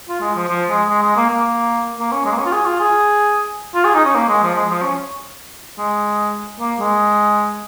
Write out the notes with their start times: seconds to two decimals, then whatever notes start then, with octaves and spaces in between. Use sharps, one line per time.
0.09 F4
0.21 G#3
0.35 F3
0.49 F3
0.69 G#3
0.89 G#3
1.03 G#3
1.17 A#3
1.30 A#3
2.00 A#3
2.12 C#4
2.26 G#3
2.32 A#3
2.38 C#4
2.46 F4
2.52 G#4
2.65 F4
2.80 G#4
3.75 F4
3.85 G#4
3.95 D#4
4.05 C#4
4.15 A#3
4.29 G#3
4.43 F3
4.55 G#3
4.70 F3
4.82 C#4
5.78 G#3
6.60 A#3
6.80 G#3